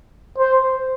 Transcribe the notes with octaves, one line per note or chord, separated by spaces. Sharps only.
C5